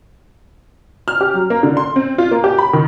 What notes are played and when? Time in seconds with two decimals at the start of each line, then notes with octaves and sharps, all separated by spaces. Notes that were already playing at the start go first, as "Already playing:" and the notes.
1.08 F6
1.21 G4
1.34 F#3
1.50 A#3
1.63 D3
1.77 C6
1.96 C4
2.18 F4
2.31 A#3
2.44 G4
2.58 B5
2.73 D#3